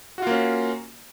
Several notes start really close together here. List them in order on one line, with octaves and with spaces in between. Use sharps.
F#4 F4 A#3 C#4